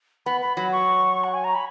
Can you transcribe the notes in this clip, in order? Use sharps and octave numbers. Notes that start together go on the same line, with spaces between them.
B3 B5
B5
F#3 B5
C#6
F#5
G#5
A#5
B5